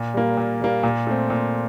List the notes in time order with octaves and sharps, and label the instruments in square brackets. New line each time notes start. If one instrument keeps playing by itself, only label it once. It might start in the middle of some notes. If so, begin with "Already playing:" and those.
Already playing: [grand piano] A#2
G3 A#3
A#2
G3 A#3
A#2
A3 C4
A#2